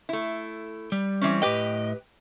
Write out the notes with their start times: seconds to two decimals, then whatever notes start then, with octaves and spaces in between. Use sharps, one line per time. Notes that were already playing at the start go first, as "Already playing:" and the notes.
0.09 A3 E4
0.92 G3
1.21 E3 C4 C#4
1.42 A2 G4 B4 D#5 G5